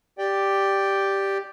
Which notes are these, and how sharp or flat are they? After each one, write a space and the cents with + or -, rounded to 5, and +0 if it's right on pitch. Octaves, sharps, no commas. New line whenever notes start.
G4 +0 D5 +0 G5 +0